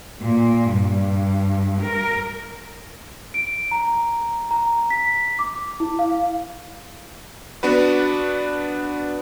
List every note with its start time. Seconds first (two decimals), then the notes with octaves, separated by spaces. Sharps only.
0.22 A#2
0.72 G2
1.81 A#4
3.34 D7
3.71 A#5
4.51 A#5
4.90 B6
5.39 D6
5.80 E4
5.99 F5
7.63 B3 D4 F#4 B4